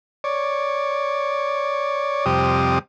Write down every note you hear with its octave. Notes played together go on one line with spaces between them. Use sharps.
C#5 D5
F2 C3 G3 G4 D#6